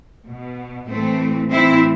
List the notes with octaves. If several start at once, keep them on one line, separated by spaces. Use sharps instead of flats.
B2
A2 E3 A3 C4
A2 E3 C4 E4